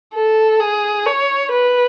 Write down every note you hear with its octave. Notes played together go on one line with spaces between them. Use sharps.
A4
G#4
C#5
B4